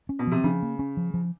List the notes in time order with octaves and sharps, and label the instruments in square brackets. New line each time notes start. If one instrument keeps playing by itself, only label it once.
[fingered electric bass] C#4
[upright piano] B2
[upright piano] C3 [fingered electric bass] F3
[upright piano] C#3 [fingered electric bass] F3
[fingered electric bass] A#3
C#4
F3
F3